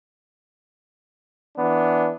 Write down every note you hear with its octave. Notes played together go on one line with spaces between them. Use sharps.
E3 B3 D4